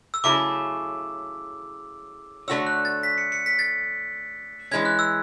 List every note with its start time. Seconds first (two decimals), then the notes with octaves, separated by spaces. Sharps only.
0.14 E6
0.24 C#3 F#3 A3 E4 G#4 D6
2.48 D3 A3 C#4 F#4 C#5 E6
2.67 F#6
2.85 A6
3.03 B6
3.18 C#7
3.32 C#7
3.46 B6
3.59 A6
4.71 E3 G#3 C#4 G#6
4.85 F#6
4.99 E6